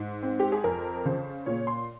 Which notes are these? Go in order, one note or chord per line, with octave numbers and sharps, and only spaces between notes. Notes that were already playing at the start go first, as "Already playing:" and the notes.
Already playing: G#2
C4
G4
G#4
F2 A#4
C#3 C5
A#2 C#5
C6